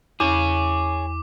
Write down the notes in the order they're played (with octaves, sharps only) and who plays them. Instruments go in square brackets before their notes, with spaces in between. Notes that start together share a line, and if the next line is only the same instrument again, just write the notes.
[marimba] E2 [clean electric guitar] G#4 C#5 [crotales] D6